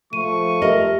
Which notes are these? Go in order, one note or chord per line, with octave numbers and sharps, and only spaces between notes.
F3 A3 C#6 D#7
G4 A#4 D#5 E5